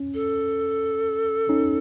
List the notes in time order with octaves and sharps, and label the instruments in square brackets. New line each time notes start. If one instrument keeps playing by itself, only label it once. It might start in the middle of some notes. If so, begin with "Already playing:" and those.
Already playing: [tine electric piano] C#4
[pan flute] A4
[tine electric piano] C#4 D#4